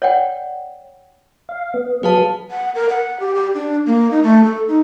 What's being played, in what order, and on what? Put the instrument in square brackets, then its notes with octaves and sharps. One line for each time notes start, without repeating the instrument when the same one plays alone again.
[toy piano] C#5 D5 F#5 G5
[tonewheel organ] F5
B3
[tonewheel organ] F#3 G#4 [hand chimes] B4 F5 A5
[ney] F#5
A#4
F#5
G4
G4
D4
A#3
D#4
A3
A4
D#4